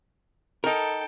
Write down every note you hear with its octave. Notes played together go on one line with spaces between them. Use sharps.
D#4 A4 A#4 G5